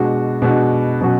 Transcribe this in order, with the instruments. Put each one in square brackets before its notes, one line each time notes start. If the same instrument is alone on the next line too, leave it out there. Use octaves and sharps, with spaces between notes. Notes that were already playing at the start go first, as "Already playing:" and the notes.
Already playing: [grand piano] B2 G#3 D4 F#4
B2 G#3 D4 F#4
B2 F#3 C#4 F#4